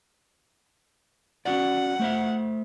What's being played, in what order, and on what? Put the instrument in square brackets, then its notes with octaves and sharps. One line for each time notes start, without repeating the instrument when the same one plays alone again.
[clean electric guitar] C#4 F#4 D5 [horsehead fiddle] F#5
[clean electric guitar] A3 C5 E5